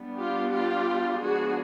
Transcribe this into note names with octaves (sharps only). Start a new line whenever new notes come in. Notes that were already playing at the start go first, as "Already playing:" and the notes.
Already playing: G3 B3 D4
F4 G4
F4 G4
F3 G#3 B3 D4 F#4 G#4